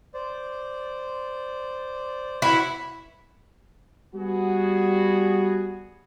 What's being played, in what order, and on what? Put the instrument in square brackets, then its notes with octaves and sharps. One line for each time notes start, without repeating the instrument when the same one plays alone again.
[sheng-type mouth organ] C5 D5
[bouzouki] E4 F#4 [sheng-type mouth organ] B4 C#5 F#5
[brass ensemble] G3 B3 F#4 G#4